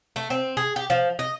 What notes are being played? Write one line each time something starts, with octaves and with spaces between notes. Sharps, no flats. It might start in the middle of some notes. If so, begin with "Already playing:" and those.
A3
C4
G#4
G4
F3
D#5